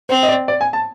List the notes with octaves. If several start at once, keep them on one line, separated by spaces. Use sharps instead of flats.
C4 C5
D#5
D5
D5
G#5
A5